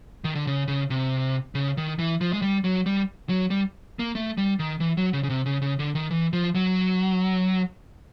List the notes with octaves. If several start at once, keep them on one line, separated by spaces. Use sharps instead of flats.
D#3
D3
C#3
C#3
C3
C#3
D#3
E3
F3
G#3
G3
F#3
G3
F#3
G3
A#3
A3
G3
D#3
E3
F#3
C#3
C#3
C3
C#3
C#3
D3
D#3
E3
F3
F#3